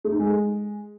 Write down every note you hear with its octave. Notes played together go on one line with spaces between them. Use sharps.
A3
D#4
G#3